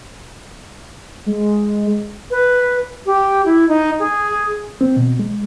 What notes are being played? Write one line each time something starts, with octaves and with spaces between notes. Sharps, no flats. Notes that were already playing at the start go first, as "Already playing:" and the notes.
G#3
B4
G4
E4
D#4
G#4
C4
B2
G#3